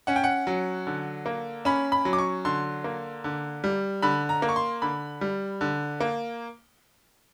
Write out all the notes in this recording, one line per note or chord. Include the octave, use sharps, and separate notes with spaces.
C#4 F#5
G5
F#5
F#3
D3
A#3
C#4 B5
B5
F#3
D6
C#6
D3 C6
A#3
D3
G3
D3 B5
A#5
A#3
C#6
C6
D3 B5
G3
D3
A#3